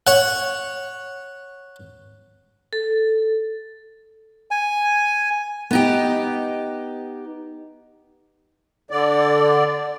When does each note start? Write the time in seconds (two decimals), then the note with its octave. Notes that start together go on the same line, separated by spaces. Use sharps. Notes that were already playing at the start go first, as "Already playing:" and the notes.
0.07 C#5 F#5
2.73 A4
4.51 G#5
5.71 B3 D#4 G4
8.91 D3 D5